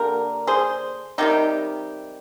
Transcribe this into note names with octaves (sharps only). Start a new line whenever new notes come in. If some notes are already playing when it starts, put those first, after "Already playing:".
Already playing: D3 A#3 G4 A#4
G#4 C5
C3 D#3 G3 D#4 G4